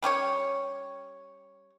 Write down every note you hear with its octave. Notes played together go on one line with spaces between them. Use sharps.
G3 C#4 G4 C#5